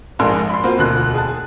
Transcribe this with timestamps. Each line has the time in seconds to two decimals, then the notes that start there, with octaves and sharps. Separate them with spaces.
0.19 A#1 G#2 A4 A#4 G#5 C6
0.50 B5 C6
0.64 A#3 C4 F4 F#4
0.78 E1 D2 B2 F4 F#6
1.14 G#4 A5